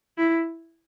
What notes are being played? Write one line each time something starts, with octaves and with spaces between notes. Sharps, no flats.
E4